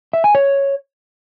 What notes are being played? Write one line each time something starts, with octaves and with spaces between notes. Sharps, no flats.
E5
G#5
C#5